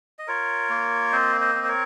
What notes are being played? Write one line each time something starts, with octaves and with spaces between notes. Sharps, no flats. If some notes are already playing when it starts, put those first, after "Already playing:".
D#5
F4 A#4 C#5
A#3
C4 C5 D#5
C5 D#5
C4
C5
A#4 C#5